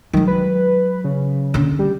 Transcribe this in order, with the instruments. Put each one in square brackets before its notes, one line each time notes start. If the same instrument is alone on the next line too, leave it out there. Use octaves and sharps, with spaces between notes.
[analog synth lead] D#3 [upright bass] F#3 G#3
[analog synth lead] B4
C#3
[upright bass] D3 C#4
[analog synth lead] G3